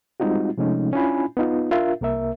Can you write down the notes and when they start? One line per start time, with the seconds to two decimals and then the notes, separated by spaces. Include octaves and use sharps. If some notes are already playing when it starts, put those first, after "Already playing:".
0.20 G3 G#3 C4 D#4 F4 F#4
0.57 C3 F3 G#3 A3 C#4 D#4
0.93 C#4 D4 E4 F4 G#5 B5
1.37 B3 D#4 F4
1.71 D4 F4 A#4 E5 F5
2.01 C2 A#3 A#4 E5